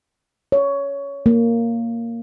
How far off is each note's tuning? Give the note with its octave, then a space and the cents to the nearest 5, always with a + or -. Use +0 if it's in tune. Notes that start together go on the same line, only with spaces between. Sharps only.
C#5 +15
A#3 -10